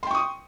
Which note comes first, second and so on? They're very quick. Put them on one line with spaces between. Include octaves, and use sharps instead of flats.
C6 G5 C#6 D#6